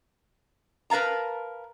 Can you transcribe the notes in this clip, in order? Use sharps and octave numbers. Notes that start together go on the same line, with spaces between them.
A#4 B4 F5 A5 A#5